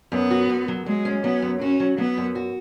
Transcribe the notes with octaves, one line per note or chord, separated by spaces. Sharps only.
F#2 B3
F#4
F#2
F#3
F#3 G#3
C#4
F#3 B3
F#2
C#4 F#4
F#3
F#3 B3
F#2
F#4